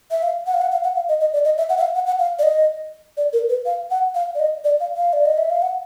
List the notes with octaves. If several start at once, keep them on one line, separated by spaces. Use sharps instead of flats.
E5
F5
F#5
F5
F#5
F5
F#5
F5
D#5
D#5
D5
D#5
E5
F#5
E5
F5
F#5
F#5
F5
D5
D#5
D5
A#4
B4
F5
F#5
F5
D5
D#5
D5
F5
F5
D5
D#5
E5
F5
F#5